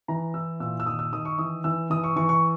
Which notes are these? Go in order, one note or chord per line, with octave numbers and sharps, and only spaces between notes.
E3 A#5
E4 E6
A#2 E6
E6
D#3 D#6
E6
D#3 D#6
C#6
E3 D#6
E3 E6
E3 D#6
C#6
E3 C#6
C#6